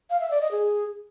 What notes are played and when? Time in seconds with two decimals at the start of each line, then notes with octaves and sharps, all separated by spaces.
0.10 F5
0.21 E5
0.31 D5
0.41 D#5
0.51 G#4